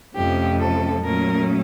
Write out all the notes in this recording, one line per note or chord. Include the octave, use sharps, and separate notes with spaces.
F2 C3 F3 A3 C#4 G4
A4
A#2 F#3 A3 C#4 A#4